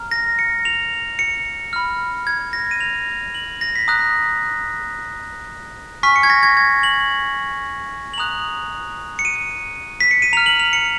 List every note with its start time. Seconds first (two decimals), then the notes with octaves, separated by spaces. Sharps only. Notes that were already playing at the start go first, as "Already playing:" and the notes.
Already playing: A#5 F6
0.11 A#6
0.39 C#7
0.65 F7
1.19 C#7
1.73 B5 F6
2.27 G#6
2.53 A#6
2.71 D#7
2.80 F7
3.34 F#7
3.61 A#6
3.75 B6
3.88 A#5 D#6 F#6 A#6
6.03 G#5 C#6 F6 B6
6.16 C#7
6.23 G#6
6.30 A#6
6.43 G#6
6.57 G#6
6.83 F#7
8.14 F#7
8.18 A#5 D#6 F#6 F7
9.19 C#7
9.25 D#7
10.01 B6
10.11 C#7
10.22 D#7
10.33 A#5 F6 F7
10.46 F#7
10.60 F7
10.73 C#7